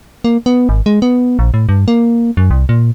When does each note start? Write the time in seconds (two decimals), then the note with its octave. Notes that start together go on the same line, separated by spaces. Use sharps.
0.24 A#3
0.46 B3
0.69 G#1
0.86 G#3
1.02 B3
1.39 A#1
1.54 A2
1.69 G2
1.88 A#3
2.37 F#2
2.51 C2
2.69 A#2